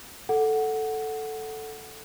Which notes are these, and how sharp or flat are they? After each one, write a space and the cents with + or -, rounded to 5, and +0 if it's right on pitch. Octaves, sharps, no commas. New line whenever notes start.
A4 +0 F#5 +0